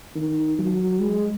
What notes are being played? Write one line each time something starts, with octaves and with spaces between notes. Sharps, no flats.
D#3
F#3
G#3